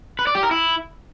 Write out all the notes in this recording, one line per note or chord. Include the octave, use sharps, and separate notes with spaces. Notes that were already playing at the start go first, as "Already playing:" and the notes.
B4
D5
G4
A#4
E4